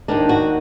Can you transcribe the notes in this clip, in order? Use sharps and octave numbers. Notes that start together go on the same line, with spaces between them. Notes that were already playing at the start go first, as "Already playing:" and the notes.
D#2 D#3 D4
F#4